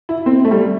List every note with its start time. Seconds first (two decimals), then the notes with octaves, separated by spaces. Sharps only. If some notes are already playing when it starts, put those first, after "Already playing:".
0.09 E4
0.26 C4
0.45 A3
0.51 G3